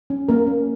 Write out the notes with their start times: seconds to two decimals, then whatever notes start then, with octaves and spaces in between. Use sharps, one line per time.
0.10 C#4
0.28 A#3 C#4 A#4
0.47 C#4